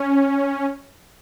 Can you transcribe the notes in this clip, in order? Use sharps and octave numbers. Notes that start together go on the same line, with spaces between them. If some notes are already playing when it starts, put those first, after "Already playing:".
Already playing: C#4